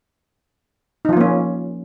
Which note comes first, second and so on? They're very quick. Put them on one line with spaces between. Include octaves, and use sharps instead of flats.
D#4 F3 F4 A#3 C#4